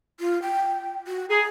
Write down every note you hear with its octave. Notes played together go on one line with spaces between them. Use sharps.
F4
G5
F#4
G#4 A#5